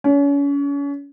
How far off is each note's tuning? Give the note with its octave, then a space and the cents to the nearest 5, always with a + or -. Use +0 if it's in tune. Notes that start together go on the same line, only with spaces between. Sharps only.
C#4 +35